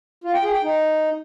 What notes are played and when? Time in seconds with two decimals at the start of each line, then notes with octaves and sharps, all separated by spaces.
0.24 F4
0.34 G5
0.44 G#4
0.53 G5
0.63 D#4